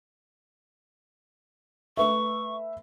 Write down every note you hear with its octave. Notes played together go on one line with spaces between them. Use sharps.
A3 B4 E5 C#6